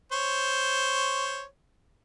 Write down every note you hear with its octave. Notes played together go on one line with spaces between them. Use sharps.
C5 C#5